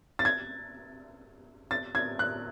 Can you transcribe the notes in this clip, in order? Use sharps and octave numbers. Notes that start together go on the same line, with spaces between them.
A6
G#6
A6
G#6
F#6